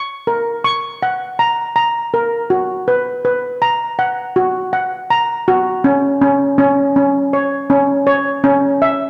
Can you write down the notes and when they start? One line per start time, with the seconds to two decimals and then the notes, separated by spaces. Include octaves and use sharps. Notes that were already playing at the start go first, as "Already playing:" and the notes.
Already playing: C#6
0.27 A#4
0.64 C#6
1.03 F#5
1.39 A#5
1.76 A#5
2.14 A#4
2.50 F#4
2.88 B4
3.25 B4
3.62 A#5
3.99 F#5
4.36 F#4
4.73 F#5
5.10 A#5
5.48 F#4
5.84 C#4
6.22 C#4
6.58 C#4
6.96 C#4
7.33 C#5
7.70 C#4
8.07 C#5
8.44 C#4
8.82 E5